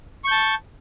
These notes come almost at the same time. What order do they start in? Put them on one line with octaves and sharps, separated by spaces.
C#6 G6 A5